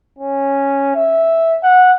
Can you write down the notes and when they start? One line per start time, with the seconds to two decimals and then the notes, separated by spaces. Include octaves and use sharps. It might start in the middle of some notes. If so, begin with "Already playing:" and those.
0.19 C#4
0.95 E5
1.63 F#5